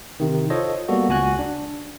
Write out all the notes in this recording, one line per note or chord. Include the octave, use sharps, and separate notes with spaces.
C3 D#3
F4 A4 C5 C#5 D#5
G3 A#3 B3 F#4 A4
C#2 F#4 G#5 F#6
D4